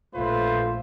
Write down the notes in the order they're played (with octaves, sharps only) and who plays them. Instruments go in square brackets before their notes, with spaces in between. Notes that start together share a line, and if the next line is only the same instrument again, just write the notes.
[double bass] A#1 [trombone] A3 [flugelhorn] F4 [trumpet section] A4 B4 C5